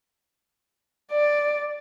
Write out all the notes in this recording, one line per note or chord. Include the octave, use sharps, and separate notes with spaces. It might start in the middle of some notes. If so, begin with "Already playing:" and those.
D5